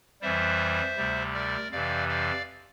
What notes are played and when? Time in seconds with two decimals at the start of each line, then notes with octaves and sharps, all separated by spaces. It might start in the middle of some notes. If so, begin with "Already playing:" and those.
0.21 F2 E3 G3 C5 E5
0.97 D2 C3 G3
1.34 A#4 D5
1.71 F2 C3 E3 D5 F5
2.08 D5 F5